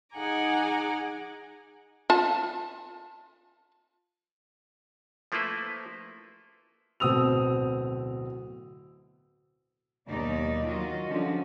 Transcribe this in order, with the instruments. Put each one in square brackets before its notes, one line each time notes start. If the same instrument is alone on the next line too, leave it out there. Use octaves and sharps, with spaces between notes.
[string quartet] D#4 G#4 F#5 G#5 A#5 D6
[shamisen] F4 A5
[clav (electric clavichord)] F3 A3 A#3 E4 B4 C5
[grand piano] D1 B2 C4 D#6 E6 F7
[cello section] D#2 B2 F#3 D#4 D5
D#3 F#3 F4 F#4 D#5
D3 F3 G3 C#4 F#4